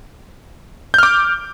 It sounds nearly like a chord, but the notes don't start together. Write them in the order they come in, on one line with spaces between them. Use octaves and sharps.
G6 F6 D6